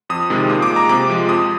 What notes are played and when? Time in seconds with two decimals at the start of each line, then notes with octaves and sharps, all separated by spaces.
0.10 F2 D#6
0.30 C3 D#3 G#3
0.50 A#2 D#6
0.62 D6
0.70 G#3
0.76 A#5
0.89 C3 D6
1.09 F3 G#3
1.29 F2 D#6